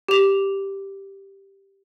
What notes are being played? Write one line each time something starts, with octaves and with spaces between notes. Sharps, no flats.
G4 F7